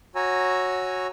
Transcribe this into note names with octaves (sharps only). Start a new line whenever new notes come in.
F#4 C#5 G#5 A#5 E6